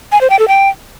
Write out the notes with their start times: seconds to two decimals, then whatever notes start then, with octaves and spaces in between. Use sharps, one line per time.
0.12 G#5
0.21 C5
0.30 G5
0.39 A4
0.48 G5